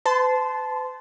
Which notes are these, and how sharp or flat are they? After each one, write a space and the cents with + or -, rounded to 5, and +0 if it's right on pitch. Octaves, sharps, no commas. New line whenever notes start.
B4 +45 A5 -15 C6 -15